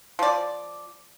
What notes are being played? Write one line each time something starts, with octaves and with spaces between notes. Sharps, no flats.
F3 D5